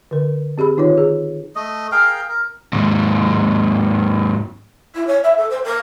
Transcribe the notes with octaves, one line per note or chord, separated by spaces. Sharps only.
D3 A#4
C4 G4 G#4 B5
D#3 D#4 F4 C#5
G#4
A3 D#5
G#4 A#4 F5 G5
A#4
D#2 G#2
E4
C#5
E5
A4
C5
A#4